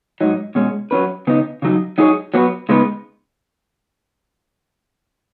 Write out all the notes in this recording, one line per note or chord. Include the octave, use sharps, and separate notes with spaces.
G#2 F#3 D#4
B2 G#3 C#4
F#3 C#4 B4
C#3 B3 D#4
C#3 F#3 D#4
F#3 D#4 G#4 C#5
F#3 B3 F#4 B4
C#3 G#3 B3 D#4 B4